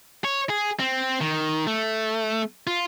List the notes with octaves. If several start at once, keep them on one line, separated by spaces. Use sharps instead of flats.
C#5
G#4
C4
D#3
A3
F4